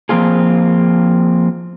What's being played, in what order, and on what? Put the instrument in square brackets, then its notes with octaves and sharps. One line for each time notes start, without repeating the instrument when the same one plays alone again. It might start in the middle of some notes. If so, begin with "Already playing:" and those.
[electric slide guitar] F3 A#3 C4 F4 G#4